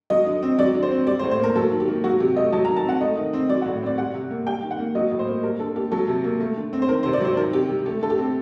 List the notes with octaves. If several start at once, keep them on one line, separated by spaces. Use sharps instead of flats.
F#3 D#5
D3
C4
F#3 D5
D3
C5
C4
G3 D5
C5
A2
C5
A#3 A#4
F#3 A4
D#3
G4
A#3
F#3 F#4
C3 G4
A3 D#5
F#3 A5
A#5
D#3
A5
C4 F#5
A3 D#5
D#3
C4
F#3 D5
F#5
A2
C4 D5
G3 F#5
C3
A#3
G3 G5
D#3
F#5
A#3
F#3 D#5
A2
C5
A#3
G3 A#4
D3 A4
A#3 G4
F#3 A4
C3
A#3
A3
D3
C4
C5
D#3 A#4
C3 C5
D5
F#3 C5
D#3 A#4
C3 G4
G3
A3 G4
D3 A4
G4
C4